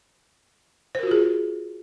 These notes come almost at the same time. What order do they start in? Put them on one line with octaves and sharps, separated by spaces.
C5 A#4 F#4 F4 G#4